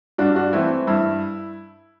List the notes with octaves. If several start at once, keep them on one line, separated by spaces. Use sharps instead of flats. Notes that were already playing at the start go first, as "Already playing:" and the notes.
G2 D4 F#4
D4 F#4
E3 A3 C4 E4
G2 E4